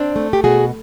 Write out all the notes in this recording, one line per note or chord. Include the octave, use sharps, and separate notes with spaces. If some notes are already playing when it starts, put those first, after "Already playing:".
Already playing: C4 D4
A3
G4
B2 F#4 G#4